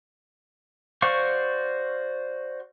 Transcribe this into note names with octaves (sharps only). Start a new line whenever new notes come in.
F#4 C5 D5 F5 C#6